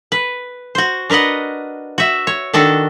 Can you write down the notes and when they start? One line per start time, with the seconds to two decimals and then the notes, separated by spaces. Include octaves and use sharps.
0.12 B4
0.75 F#4 C5
1.10 D4 A#4 B4 D#5 F#5
1.98 F#4 E5
2.27 C#5
2.53 D#3 D4 F#4 A4